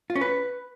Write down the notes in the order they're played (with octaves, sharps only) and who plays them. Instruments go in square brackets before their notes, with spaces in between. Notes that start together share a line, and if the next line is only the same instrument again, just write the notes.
[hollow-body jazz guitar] F4
C#4
B4